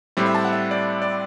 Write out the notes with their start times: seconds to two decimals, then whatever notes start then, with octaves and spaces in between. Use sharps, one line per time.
0.17 A2 G3 C4 E4
0.26 E5
0.35 A5
0.44 F#5
0.53 E5
0.71 D5
1.02 D5